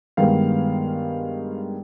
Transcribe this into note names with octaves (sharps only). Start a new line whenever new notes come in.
G2 D#3 G#3 B3 F5